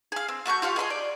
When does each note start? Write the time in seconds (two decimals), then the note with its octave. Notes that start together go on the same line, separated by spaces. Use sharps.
0.12 G#4 F5
0.28 C4
0.46 A3 F#4 C#6 G6
0.62 F4 G4 F5 F#5
0.76 G#4 D#5 B5 C6
0.90 D5